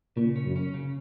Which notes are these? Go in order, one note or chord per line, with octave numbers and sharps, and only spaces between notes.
A#2 C#3
C#4
F#2
C#4
C#3